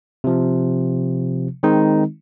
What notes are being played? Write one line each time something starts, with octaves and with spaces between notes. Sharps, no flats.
C3 F3
D#3 G#3 C4 D#4